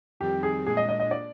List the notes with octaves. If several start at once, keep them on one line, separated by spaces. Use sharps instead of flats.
F2 D#3 G3 C4 G4
G#4
A#2 G#3 D4 G#4
D#5
D#5
D#5
D5